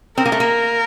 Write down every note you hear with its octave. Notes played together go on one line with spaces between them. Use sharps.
C4 A#4
A#3
A3
A#3